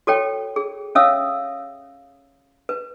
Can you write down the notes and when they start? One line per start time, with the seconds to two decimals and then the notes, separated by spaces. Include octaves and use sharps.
0.07 F#4 A4 C#5 G5
0.56 G#4
0.95 C#4 C#5 E5 F5 D#6 E6
2.69 B4